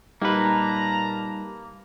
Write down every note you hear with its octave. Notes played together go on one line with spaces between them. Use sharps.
A#2 G3 A#3 D#4 G4 B4 A5 A#5